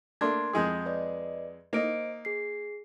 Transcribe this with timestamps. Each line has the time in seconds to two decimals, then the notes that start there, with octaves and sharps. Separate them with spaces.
0.21 A3 A#3 D4 A#4 C6 G#6
0.53 F2 G#3 G#4 D#6 G6
0.86 B4 D5 D#5
1.73 A#3 D#4 C5 D#5 D7
2.25 G#4 C7